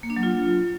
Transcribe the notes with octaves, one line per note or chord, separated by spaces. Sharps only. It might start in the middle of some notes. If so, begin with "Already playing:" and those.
A#3
D4
F#3
F4